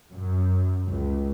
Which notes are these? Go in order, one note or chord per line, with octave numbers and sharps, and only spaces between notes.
F#2
C#2